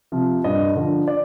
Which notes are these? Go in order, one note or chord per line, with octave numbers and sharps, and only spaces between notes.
C3 F3
G2 D#5
D3 F3
D5